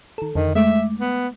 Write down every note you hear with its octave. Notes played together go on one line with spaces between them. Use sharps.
D#3 A4
F2 D3 D#3
G#3 A3 E5 D6
B3